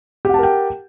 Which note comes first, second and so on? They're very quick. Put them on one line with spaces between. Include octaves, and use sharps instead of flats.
G4 F#5 A5 A#4 G5